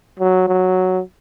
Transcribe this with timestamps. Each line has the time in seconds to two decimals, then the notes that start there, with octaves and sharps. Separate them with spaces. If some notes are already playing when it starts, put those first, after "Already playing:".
0.19 F#3
0.48 F#3